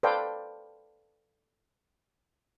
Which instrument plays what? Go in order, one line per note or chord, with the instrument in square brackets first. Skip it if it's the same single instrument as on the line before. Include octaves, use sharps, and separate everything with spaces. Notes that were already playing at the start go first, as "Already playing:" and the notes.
[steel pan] A4 B4 C5 D5 F5 G5